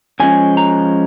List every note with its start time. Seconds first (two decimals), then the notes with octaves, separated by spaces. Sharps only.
0.20 C#3 F3 G#3 C#4 G#5
0.57 A#5